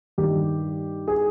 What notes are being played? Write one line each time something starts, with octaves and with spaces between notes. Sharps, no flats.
G2 D#3 G3 G4
G#4